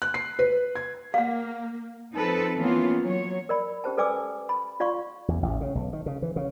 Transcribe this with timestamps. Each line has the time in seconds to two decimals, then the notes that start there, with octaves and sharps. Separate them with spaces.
0.02 F#6
0.14 C7
0.39 B4
0.75 G#6
1.14 A#3 F5 F#5
2.14 F3 C4 D#4 A4 B4
2.57 E3 A#3 B3 C#4 F4
3.01 F#3 C#5
3.49 A#4 D5 B5
3.84 C#4 G4 C5 A5
3.97 A4 B4 D5 G#5 D6 E6
4.49 B5
4.80 F4 D5 F5 C6 C#6
5.28 E2
5.43 A1
5.61 C#3
5.75 B1
5.93 D#3
6.06 C#3
6.22 E3
6.36 C#3